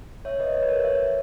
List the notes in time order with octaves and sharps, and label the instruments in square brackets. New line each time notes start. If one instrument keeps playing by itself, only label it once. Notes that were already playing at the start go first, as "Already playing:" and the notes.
[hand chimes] C#5 E5
B4 D#5
C#5
B4
A#4 C#5
C#5 E5